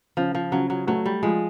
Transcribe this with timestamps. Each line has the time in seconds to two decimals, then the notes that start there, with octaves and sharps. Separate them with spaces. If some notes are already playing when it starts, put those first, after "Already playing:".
0.17 C#3 F3
0.35 F3
0.52 C#3 F#3
0.70 F#3
0.87 F#3 A3
1.06 G3
1.23 F3 G#3